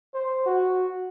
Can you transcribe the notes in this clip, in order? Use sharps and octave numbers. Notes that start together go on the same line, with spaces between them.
C5
F#4